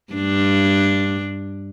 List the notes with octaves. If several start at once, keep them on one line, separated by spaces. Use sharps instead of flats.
G2 D4